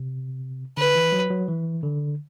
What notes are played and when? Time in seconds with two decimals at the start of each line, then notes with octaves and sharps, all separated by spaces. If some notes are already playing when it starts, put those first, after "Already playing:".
Already playing: C3
0.77 D3 B4
0.95 E3
1.12 F#3
1.30 F#3
1.48 E3
1.83 D3